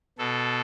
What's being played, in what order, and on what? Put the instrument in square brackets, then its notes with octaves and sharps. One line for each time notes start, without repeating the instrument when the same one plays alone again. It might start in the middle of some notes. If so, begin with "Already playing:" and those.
[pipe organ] B2 A4